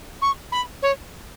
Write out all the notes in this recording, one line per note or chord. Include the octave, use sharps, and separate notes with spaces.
C#6
B5
C#5